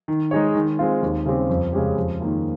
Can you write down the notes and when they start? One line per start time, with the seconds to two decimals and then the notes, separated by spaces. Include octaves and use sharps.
0.08 D#3
0.31 G#3 D#4 G#4 C#5
0.55 D#3
0.79 G#3 C4 F4
1.02 D#2
1.26 C#3 G3 C4 G4
1.49 F2
1.73 C#3 G#3 C#4 G4
1.96 F2
2.20 D#3 A#3 F4